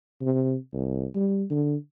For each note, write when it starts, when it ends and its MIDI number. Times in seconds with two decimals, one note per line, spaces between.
0.21 0.56 48
0.73 1.05 36
1.15 1.44 55
1.50 1.76 50